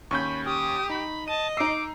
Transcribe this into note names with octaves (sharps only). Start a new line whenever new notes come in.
D#2 C#4 B5 C#6 G6
G4 D#6
D#4 B5
D#5 A5 D#7
D#4 D6 E6 C7